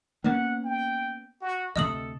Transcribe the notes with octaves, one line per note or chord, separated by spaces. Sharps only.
A#3 B3 C#4 F#5
G5
F#4
D2 C3 A4 D#5 D#6 F#7